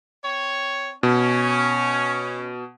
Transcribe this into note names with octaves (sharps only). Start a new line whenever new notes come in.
C4 C#5
B2 C#4